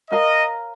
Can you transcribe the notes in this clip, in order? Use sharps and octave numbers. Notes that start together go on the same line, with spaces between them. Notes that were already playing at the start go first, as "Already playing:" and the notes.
A#4 C#5 D#5 F5 A#5